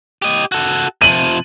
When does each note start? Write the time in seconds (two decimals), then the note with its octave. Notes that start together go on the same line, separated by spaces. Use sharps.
0.22 G4 D#5
0.52 F#4 A4
1.02 C3 F3 D#7 F#7